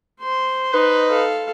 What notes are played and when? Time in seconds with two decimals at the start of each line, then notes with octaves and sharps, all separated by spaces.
0.20 C5 C6
0.73 D#4 B4
1.09 A4 F5